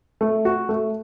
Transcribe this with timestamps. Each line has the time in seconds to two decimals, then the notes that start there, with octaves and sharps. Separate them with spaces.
0.21 A3
0.45 F#4
0.69 A3